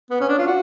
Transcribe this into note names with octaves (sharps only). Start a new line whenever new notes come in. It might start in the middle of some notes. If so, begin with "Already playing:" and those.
B3
C#4
D4
F4
F#4